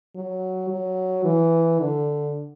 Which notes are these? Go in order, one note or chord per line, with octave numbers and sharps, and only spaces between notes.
F#3
F#3
E3
D3